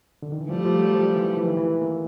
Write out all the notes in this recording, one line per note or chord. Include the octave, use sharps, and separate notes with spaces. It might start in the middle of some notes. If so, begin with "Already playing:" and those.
D3
D#3
E3
F3 G3 A3
F3
F#3
F3
E3
E3
D#3
E3
A#3